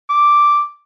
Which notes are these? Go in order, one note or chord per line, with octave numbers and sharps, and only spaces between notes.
D6